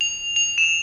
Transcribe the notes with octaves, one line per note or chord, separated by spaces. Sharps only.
F7
F7
E7